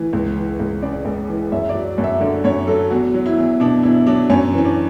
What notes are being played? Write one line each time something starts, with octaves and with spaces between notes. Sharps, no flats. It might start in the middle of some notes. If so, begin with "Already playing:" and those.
Already playing: D2 E3
C#2
E3
C#2
C#3 D5
C#2
E3
F#2 E5
D5
F#3
F#2
E5
D3 D5
F#2 C#5
F#3 A4
E2 F#4
F#3
E4
E2
B2 D4
E2 E4
F#3 D4
F#2 C#4
E3 C#4
D4